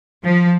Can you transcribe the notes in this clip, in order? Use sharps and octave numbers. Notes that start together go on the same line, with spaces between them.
F3